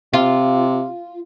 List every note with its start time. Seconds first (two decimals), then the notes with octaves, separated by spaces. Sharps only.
0.13 C3 F4